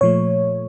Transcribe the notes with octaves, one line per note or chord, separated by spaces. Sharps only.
A#2 F3 A3 C#5